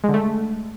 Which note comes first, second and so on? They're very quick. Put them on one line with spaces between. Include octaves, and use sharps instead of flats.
G#3 D3 A3